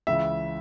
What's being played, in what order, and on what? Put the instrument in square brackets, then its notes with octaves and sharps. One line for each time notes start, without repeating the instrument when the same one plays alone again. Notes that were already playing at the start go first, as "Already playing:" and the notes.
[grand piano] C#2 C#3 E3 E5